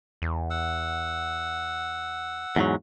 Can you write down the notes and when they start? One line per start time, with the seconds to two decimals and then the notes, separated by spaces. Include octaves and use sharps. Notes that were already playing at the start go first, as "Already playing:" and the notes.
0.22 E2
0.50 F#5 E6
2.56 E2 G#2 F#3